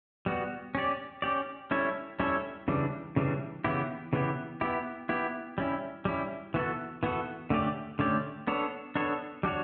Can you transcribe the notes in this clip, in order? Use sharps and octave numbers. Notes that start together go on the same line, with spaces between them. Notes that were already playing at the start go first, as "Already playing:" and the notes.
G3 B3 F#4
C#4 G4 D5
C#4 G4 D5
G3 C#4 E4 A4 C#5
G3 C#4 E4 A4 C#5
C#3 E3 G3 D4
C#3 E3 G3 D4
C#3 E3 B3 E4 G4
C#3 E3 B3 E4 G4
B3 E4 G4
B3 E4 G4
G3 C#4 E4
G3 C#4 E4
E3 B3 F#4 A4
E3 B3 F#4 A4
D3 A3 C#4 G4 D5
D3 A3 C#4 G4 D5
B3 D4 A4 C#5
B3 D4 A4 C#5
G3 D4 F#4 C#5